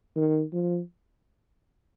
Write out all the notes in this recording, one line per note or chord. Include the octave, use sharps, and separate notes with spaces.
D#3
F3